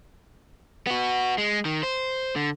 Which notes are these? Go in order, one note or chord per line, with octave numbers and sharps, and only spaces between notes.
B3 F#4
G#3
D#3
C5
D3